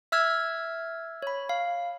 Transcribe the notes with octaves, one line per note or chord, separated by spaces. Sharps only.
E5 E6 F6 G#6
C#5 B5
F5